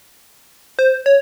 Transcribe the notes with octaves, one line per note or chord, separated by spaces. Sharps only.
C5
C#5